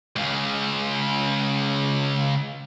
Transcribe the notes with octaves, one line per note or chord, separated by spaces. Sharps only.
C#2 C#3